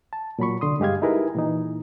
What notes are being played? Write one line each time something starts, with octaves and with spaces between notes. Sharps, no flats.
A5
A#2 F#3 B5 C#6
C2 D3 C6 D#6
G2 G#3 G4 F5 G#6
D#4 E4 G4 G#4 A#4 B4
A#2 E3 D#4